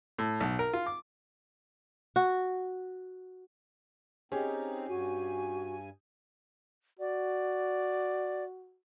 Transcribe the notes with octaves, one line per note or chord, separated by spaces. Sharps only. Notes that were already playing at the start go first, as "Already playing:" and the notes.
A2
B1
A#4
F4
D6
F#4
C4 C#4 D#4 G4 G#4
G2 F#4 G#5
F#4 D5